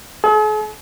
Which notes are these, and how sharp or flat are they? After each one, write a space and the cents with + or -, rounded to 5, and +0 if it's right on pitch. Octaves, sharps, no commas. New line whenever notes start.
G#4 +45